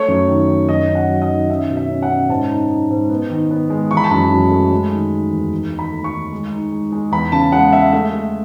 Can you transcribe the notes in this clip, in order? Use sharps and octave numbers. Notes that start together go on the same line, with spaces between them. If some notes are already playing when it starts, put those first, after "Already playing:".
Already playing: A3 C#5
F#2
D#3
D#3
F#2 D#5
C#4
F#5
F#3
D#5
D#3
C#4 E5
B2
E5
C#4
F#5
C#4
G#2 A5
D#4
D#4
G#2
B3
D#3
B3
G#3
E3 C#6
B5
A5
F#2 B5
F#2
A3
G#3
D#3
D#4
E2
D#4
D#3
B5
A3
C#6
D#3
G#3
D#4
G#3
G#3
E2 B5
C#3 A5
G#3 F#5
G#3 E5
A3 E5
A3